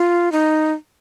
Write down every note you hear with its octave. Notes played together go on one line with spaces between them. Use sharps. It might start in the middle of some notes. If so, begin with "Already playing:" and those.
Already playing: F4
D#4